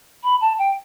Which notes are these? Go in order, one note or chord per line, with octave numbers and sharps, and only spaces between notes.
B5
A5
G5